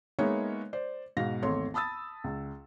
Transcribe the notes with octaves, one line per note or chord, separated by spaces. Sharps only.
G#3 A#3 B3 D#4 C#5 E5
C5 D5
G#2 B2 F5 A#6
G#1 E2 A3 C#5 C6
A5 B5 D#6 E6 A6
C#2